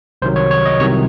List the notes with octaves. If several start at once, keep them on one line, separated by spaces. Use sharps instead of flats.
C2 C3 D#3 F#3 C5
C#5
C#5
D#5
C2 C3 D#3 F#3 C#5